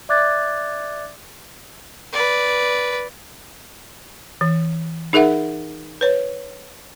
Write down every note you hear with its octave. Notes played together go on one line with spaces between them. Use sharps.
D5 E5 D6 F#6 G#6 A6
B4 D5
E3
D#4 G#4 A#4 E5 F#5
B4 C#5